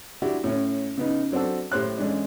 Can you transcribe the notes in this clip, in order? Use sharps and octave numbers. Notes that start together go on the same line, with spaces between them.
D4 E4 F#4 G4
A2 C#4
C#3 B3 D#4
F#3 C4 D4 F#4 A4
A2 G4 C5 F#6
A1 G#3 D4